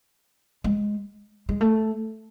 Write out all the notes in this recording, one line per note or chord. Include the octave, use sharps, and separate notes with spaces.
G#3
G#3
A3